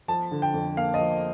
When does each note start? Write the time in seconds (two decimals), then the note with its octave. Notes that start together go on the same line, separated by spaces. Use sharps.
0.08 F3 A5
0.31 D3
0.42 G5
0.54 F2
0.77 A#3 F5
0.94 D#5
1.00 F3